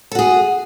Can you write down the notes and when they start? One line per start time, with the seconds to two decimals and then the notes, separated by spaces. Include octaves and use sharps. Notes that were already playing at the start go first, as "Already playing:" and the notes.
0.12 A4
0.15 F#4
0.19 G#4